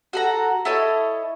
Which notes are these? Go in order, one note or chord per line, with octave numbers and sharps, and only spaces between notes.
F#4 A4 A#5
E4 A4 C#5 D#5